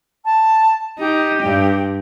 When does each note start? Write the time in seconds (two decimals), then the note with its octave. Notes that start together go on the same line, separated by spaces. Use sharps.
0.25 A5
0.99 D#4 G4
1.44 G2